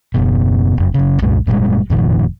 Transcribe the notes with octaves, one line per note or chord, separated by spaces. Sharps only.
F#1 B2
F1 F#2
F#1 C#3
C2 F#2 A#2 G#3
F#1 A#2 G3 G#3
F1 A#2 D#3 F3